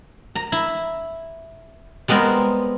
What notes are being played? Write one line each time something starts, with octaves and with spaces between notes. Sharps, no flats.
A#5
E4
G3 G#3 B3 C4 A#4